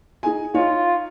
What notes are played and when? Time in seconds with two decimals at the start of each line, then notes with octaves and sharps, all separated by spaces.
0.23 D#4 G#4 G#5
0.54 D#4 F4 C#5